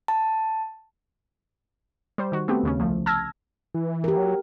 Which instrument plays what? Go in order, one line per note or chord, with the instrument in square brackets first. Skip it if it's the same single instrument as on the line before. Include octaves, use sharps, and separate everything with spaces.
[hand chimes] A5
[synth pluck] G3 C5
D#3 F#4
A3 B3 C4 G4
D#2 C#3 C#4
C2 F3 A3
A5 E6 F6 G#6 A#6
[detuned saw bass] E3
[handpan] G4 A#4
[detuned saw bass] F#3